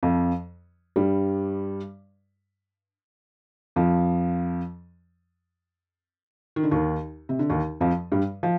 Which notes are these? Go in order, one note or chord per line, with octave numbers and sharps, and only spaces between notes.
F2 F3
G2 G3
F2 F3
D#3
D3
D#2 D#3
C3
D3
D#2 D#3
F2 F3
G2 G3
F3